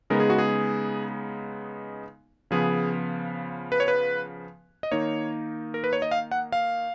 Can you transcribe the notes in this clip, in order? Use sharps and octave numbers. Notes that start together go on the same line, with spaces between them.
C#3 G#3 B3 D#4 A#4
G#4
F#4
G#4
C#3 F3 B3 G#4
B4
C#5
B4
D#5
D#3 A#3 D#4 C#5
A#4
B4
C#5
D#5
F5
F#5
F5